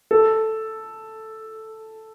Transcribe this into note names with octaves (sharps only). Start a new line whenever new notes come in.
A4